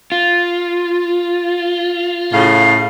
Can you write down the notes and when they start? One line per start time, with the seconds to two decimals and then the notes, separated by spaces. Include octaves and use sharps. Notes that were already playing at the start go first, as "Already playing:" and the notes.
0.12 F4
2.33 A2 C#3 F5